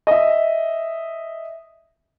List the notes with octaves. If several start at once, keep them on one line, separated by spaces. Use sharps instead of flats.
D#5 E5